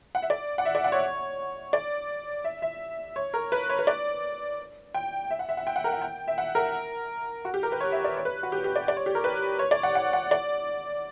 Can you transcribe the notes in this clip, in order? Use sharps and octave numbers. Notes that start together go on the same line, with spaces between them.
F#5
E5
D5
F#5
E5
D5
F#5
C#5
D5
E5
E5
C#5
A#4
B4
C#5
B4
D5
G5
E5
F#5
E5
F#5
G5
F#5
A#4
F#5
G5
E5
F#5
A#4
F#4
G4
A#4
B4
C#5
E5
D5
C#5
B4
F#4
G4
G4
D5
D5
C#5
G4
A#4
B4
C#5
D5
F#5
F#5
F#5
D5